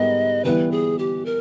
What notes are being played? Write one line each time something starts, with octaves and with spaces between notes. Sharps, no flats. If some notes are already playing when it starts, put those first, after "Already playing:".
Already playing: G#2 G3 B3 G4 A#4 D#5
E3 G3 B3 E4 B4
G#4
G4
A#4